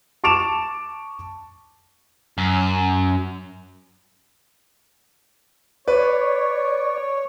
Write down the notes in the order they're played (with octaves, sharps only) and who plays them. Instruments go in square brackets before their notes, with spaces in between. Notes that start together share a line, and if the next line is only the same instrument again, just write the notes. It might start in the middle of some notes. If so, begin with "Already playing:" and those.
[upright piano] A5 C#6 D6 D7 E7 F7
[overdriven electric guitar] F#2
[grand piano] B4 [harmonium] C#5 [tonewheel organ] D5